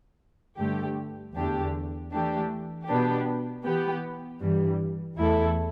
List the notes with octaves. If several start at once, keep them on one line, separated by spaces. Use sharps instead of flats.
G2 D3 A3 G4
E2 D3 A3 D4 G4
E3 A3 D4 G4
B2 B3 D4 G4
E3 B3 G4
G2 E3 G3
E2 E3 A3 E4 A4